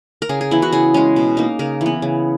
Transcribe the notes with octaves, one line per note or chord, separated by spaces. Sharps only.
A#4
C#3 G#4
G#4
E3 B3 E4
F#4
C#3 G#4
G#3 C#4
B2
A#3 D#4
C#3 A#4
E3 B3
C#3